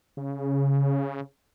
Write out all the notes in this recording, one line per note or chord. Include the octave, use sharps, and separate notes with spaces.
C#3